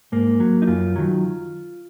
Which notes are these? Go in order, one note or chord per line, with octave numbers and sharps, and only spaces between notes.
G#2 A#3
F#3
D#4
F#2 F4
D#3 F#3